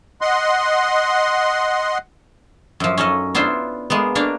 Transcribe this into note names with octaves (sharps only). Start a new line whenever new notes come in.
D#5 F#5 C6
F#2 F3
C#4 D#4 A4 D#5
B3 D4 E4 F4 C5
G#3 A#3 B3
A#3 D4 C#5 D5